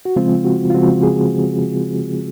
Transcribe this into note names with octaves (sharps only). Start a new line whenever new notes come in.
F#4
C#3 F3 G#3 C4 F4
F#4
F4
C#3 F3 G#3 C4 F#4
G#4